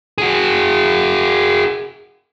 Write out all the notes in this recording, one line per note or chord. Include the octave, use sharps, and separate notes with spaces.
F#4 G#4